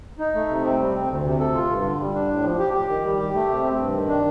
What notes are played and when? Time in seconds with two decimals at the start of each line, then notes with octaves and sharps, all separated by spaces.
0.19 D#4
0.35 A3
0.49 C3
0.65 C4
0.80 G3
0.94 C4
1.09 D2
1.25 C3
1.40 A4
1.55 F4
1.70 G2
1.84 D3
1.99 G3
2.14 D4
2.29 A2
2.43 F3
2.59 G4
2.74 G4
2.88 D#3
3.04 G3
3.18 G4
3.34 A3
3.49 C3
3.63 C4
3.79 G2
3.93 D#3
4.09 D4